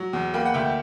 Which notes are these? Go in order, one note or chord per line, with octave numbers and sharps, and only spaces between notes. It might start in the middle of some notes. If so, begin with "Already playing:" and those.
Already playing: F#3
E2
A#3 G5 B5
F#5
D2 E5 G5